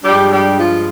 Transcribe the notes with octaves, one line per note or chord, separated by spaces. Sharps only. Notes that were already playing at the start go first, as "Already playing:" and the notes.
G2 F3 G3 G#3 D4 G4
G3 G4
F3 F4